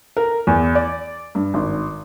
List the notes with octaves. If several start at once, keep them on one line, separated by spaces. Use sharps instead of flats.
A#4
E2
D5
G2
G#1